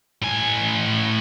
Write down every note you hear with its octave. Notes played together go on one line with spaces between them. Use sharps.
A2 G#5